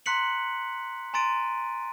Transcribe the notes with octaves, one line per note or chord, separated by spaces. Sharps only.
A#5 C6 F#6 B6 C#7 F#7
G#5 A#5 C6 A6 D7 D#7